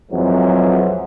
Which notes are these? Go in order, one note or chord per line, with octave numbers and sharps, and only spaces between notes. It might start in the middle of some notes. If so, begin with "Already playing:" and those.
F2 G#2 E3 F#3